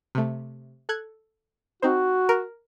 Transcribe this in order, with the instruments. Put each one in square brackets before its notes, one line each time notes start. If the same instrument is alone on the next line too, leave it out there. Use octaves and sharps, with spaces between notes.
[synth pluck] C3 A3
A4 F#6 G#6
[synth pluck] C4 D#4 C5 [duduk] F#4
[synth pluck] A#4